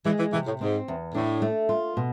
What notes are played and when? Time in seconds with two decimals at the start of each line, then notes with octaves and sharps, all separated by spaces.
0.05 E3 G#3
0.19 E3
0.33 C3 E3
0.46 A2
0.61 G#2 C4
0.88 E2
1.15 A2 D4
1.42 A3
1.69 F4
1.97 B2